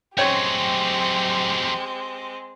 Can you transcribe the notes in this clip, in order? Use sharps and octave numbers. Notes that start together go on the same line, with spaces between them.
F#3 G#3 A3 C4 G4 C#5 G5